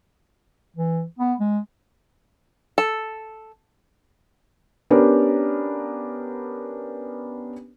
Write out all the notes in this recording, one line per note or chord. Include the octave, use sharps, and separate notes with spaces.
E3
B3
G#3
A4
B3 C#4 D4 G4 A#4 B4